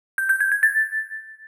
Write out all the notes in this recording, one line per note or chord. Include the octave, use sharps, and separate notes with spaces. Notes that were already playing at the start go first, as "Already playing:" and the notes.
G6
G6
G#6
G#6
A6